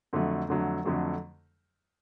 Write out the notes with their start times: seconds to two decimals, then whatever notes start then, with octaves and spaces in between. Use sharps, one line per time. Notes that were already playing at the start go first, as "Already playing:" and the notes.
0.13 F2 D3 F#3 A3
0.48 F2 D3 F#3 A3
0.85 F2 D3 F#3 A3